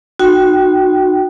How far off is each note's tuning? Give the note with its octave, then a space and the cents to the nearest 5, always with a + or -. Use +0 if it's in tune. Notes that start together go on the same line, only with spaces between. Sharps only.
D#4 -35 F#4 -10 G5 -20